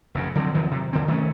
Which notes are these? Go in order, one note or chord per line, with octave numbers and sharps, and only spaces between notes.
F1 F#2 C#3
D3 F3 F#3 C4
E2 D#3 F3 F#3
C3
D#2 D3 C4
D#3 A3 B3 C#4